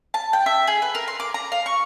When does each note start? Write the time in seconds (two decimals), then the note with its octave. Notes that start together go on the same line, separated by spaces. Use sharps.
0.14 A5
0.33 G5
0.46 E5
0.67 G#4
0.82 B4
0.95 A#4
1.08 C6
1.20 D6
1.34 A#5
1.52 F5
1.66 C#6